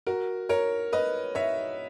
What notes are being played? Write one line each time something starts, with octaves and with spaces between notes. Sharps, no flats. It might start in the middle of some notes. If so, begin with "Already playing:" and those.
F#4 A#4
A#4 C#5
B4 D#5
C#5 E5